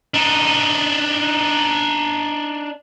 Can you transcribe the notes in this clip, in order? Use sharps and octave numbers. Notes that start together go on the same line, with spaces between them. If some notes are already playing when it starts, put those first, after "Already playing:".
D4 D#4